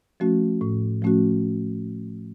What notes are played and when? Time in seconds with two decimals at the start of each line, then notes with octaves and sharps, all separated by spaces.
0.20 F3 A3 C#4 F#4
0.61 A2
1.02 F3 A3 C#4 F#4